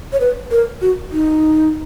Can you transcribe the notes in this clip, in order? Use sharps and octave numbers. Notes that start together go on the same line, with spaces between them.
C#5
B4
A#4
F#4
D#4